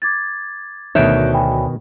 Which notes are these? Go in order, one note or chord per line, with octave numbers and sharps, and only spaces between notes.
D6 G#6 A6
D2 B2 D#3 C#5 E5 F#6 G6 D7
G5 G#5 B5